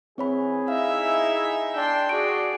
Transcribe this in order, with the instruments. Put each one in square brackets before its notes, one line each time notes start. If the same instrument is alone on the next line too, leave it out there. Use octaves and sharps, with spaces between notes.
[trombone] E3 [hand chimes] C4 C#5 B5 [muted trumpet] G#4
[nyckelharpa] D#4 E5 [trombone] E4 [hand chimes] F5
[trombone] D4 [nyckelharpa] G5 C6
[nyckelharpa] F#4 G#4 [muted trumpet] D5 [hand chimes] D7